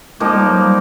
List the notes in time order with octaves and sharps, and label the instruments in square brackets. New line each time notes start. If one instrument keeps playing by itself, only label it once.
[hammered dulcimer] F3 A#3 D#4 G4 [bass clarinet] G#3
[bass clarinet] G3
F#3
G3